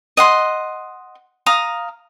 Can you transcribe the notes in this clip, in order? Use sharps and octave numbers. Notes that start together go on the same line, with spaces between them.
D#5 F#5 C6
F5 A#5 D#6